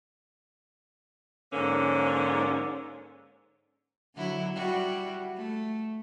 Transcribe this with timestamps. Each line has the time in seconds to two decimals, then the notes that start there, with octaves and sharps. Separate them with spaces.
1.53 G#2 D3 F3 A#3 C#4
4.15 D3 F#3 E4
4.53 G3 E4 F#4
5.36 A3